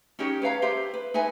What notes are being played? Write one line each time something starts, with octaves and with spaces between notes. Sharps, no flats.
C#4 D#4 G4 C#5
B4 C#5 F5 A#5
G4 B4 C5 E5
B4
D#4 B4 E5 G#5